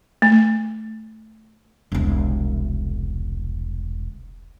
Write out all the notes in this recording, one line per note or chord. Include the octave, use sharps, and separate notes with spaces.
A3
E1 C2